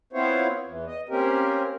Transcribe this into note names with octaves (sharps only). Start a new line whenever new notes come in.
B3 C4 E4 F4 C5 C#5
E2 E3
D#5
A#3 C4 C#4 G4 A#4